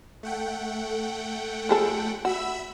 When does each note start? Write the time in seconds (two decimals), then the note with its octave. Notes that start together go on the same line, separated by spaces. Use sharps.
0.23 A3 F#5 G5
1.69 F3 G#4 A4
2.25 F#4 E5 B5 E6